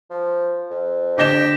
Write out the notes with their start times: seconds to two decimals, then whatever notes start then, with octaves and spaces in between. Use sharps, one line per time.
0.10 F3
0.71 F2
1.18 D3 G4 D#5 D6 A#6 E7 G7